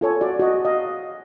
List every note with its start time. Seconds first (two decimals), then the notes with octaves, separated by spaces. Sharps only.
0.01 F4 A4 C#5 G#5
0.21 F#4 D5
0.40 F#4 D#5
0.65 D#5 F5